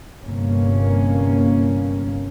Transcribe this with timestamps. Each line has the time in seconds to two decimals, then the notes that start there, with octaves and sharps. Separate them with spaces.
0.25 G1 C3 A#3 C#4